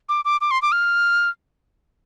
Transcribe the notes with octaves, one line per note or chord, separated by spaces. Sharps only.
D6
D6
D6
C6
D6
F6